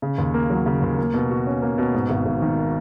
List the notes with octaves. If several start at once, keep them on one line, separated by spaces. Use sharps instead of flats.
C#3
D#2
A#3
F#3
C#3
D#2
A#3
B2
F#4
C#4
A#3
B2
G#2
G#1
G#1
D#3